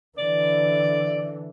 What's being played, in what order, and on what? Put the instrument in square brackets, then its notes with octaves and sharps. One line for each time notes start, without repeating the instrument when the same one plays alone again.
[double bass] D3 E3 [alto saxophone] D5